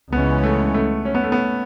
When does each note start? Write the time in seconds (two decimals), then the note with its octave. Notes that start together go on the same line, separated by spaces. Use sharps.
0.12 C#2 C#3 E3 G#3 B3 C#4
0.43 A3
0.74 A3
1.05 C#4
1.15 B3
1.24 A3
1.32 B3